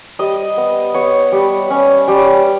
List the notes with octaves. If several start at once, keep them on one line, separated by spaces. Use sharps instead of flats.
G3 D#5
B3
B3 C#5
G3
C#4
G3